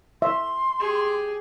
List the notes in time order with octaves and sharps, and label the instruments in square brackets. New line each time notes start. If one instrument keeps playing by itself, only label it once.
[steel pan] E5 [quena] C6
[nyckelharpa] G4 G#4